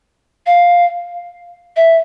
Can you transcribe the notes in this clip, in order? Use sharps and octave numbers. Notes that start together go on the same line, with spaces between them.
F5
E5